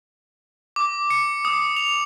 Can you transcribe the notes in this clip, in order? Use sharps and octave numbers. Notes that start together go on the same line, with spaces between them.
D6
C#7
D#6
F7